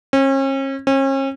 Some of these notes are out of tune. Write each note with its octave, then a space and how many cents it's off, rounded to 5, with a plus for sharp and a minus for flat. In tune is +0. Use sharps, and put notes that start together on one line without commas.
C#4 -40
C#4 -40